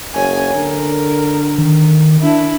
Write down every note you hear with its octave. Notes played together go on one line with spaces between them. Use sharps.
F#1 C#5 G#5
D3 A#4
D#3
D4 E4